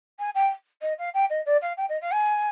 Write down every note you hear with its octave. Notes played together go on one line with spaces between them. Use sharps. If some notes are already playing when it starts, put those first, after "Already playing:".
G#5
G5
D#5
F5
G5
D#5
D5
F5
G5
D#5
F5
G#5